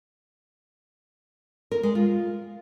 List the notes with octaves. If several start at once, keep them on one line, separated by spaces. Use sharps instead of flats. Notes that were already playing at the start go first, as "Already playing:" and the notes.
A#4
G#3
F4